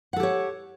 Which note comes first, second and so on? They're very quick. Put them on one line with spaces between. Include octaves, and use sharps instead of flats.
F#5 A4 G4 C#5